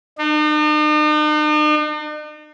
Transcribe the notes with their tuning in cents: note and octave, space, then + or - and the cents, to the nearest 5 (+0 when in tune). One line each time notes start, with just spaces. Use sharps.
D#4 -45